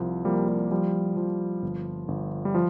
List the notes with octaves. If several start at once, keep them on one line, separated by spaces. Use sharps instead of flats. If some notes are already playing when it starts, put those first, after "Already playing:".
Already playing: C2 F3
F3 G3 A#3
G3
F3 G3
F3
G1
G1
G3
F3